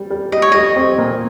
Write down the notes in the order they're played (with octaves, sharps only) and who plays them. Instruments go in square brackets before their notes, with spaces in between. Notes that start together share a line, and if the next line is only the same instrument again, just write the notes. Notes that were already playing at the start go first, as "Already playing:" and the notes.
Already playing: [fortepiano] G3
G3
[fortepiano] G3 [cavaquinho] D#5
[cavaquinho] C#5
[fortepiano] G3 [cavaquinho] D#5
[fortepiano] C4
A#2